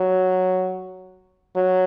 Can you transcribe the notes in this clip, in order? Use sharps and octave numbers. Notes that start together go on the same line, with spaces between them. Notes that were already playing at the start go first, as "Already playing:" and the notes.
Already playing: F#3
F#3